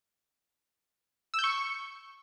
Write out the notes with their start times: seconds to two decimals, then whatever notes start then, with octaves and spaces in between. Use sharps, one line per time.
1.34 E6
1.39 G6
1.44 C#6